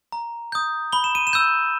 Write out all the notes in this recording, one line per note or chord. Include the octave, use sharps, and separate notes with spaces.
A#5
D#6 G6
B5 G7
E7
D#7
E7
E6 G6